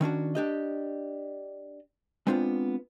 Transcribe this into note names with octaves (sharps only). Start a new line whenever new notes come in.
D#3 C#4 D4 F#4
D4 G4 D#5
G#3 B3 C4 D4 F4